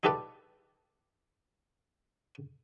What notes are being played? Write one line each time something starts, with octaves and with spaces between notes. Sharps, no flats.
D#4 F4 G4 A4 B4 D5